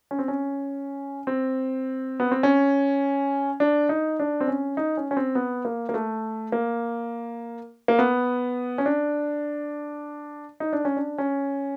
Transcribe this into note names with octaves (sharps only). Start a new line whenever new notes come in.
C#4
C4
C#4
C4
B3
C4
C#4
D4
D#4
D4
C4
C#4
D#4
C#4
C#4
C4
B3
A#3
A#3
A3
A#3
A#3
B3
C#4
D4
D#4
D4
C#4
D4
C#4